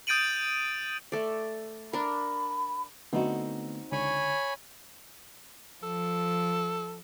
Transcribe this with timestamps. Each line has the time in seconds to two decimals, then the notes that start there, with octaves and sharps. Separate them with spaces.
0.07 D#6 G6 A6 D7 D#7 F#7
1.12 A3 D5
1.93 D4 A#4 B5
3.13 D3 A3 B3 C4 D#4 F#4
3.92 C#2 D3 C#5 G#5 B5 C#6
5.83 F3 A4